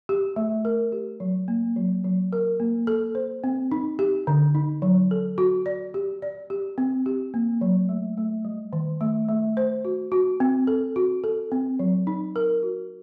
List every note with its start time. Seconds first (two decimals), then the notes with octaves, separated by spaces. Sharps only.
0.09 G4
0.36 A3
0.65 A#4
0.92 G4
1.20 F#3
1.48 A#3
1.76 F#3
2.04 F#3
2.33 A#4
2.60 A#3
2.87 A4
3.15 C5
3.44 C4
3.71 D#4
3.99 G4
4.27 D3
4.55 D#4
4.82 F#3
5.11 A4
5.38 F#4
5.66 D5
5.94 G4
6.22 D5
6.50 G4
6.78 C4
7.06 G4
7.34 A#3
7.61 F#3
7.89 A3
8.17 A3
8.45 G3
8.73 D#3
9.01 A3
9.28 A3
9.57 C5
9.85 F#4
10.12 F#4
10.40 C4
10.67 A4
10.96 F#4
11.24 A4
11.52 C4
11.79 F#3
12.07 D#4
12.36 A#4
12.63 F#4